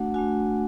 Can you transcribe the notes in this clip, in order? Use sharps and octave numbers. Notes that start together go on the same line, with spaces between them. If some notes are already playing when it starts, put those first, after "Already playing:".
Already playing: A3 D4 F#4 F#5
A3 D4 F#4 G#5